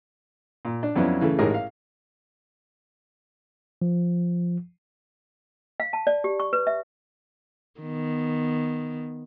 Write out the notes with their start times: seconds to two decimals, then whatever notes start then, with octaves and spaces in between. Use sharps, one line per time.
0.65 A#2
0.83 D4
0.96 F2 F#3 B3 C#4 D4 E4
1.21 C#3 E3 A3
1.39 A1 G#2 G4 G#4 A#4
1.54 F5
3.82 F3
5.80 F5
5.93 A5
6.07 D5
6.24 G4
6.40 C#6
6.53 B4
6.67 E5
7.81 D#3 B3